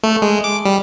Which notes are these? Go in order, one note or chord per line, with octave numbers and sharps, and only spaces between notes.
A3
G#3
D6
G3